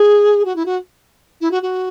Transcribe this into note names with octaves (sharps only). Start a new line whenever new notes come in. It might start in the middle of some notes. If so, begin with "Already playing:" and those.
Already playing: G#4
F#4
E4
F#4
E4
F#4
F#4